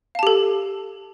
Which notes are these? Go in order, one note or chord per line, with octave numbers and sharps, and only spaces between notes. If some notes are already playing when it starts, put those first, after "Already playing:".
G4 A4 F5 A5